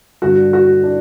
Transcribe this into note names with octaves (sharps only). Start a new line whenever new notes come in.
G2 D3 F#4
F#4
D4